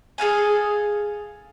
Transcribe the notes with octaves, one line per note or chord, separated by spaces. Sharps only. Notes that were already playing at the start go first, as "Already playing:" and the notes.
G#4 A4 F5 G#5